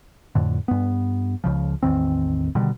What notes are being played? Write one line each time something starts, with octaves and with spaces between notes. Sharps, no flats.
F2 A2 D3
G2 B3
C#2 C#3 F3
A1 E2 D#3 C4
B2 D3 D#3 G3